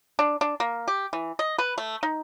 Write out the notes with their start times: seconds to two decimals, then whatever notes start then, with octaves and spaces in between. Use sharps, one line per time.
0.19 D4
0.41 D4
0.60 A#3
0.88 G4
1.13 E3
1.39 D#5
1.59 B4
1.78 A3
2.03 D#4